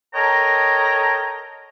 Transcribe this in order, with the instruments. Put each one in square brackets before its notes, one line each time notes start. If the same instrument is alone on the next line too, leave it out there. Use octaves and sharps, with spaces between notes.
[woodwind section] A4 A#4 C#5 D#5 G5 A#5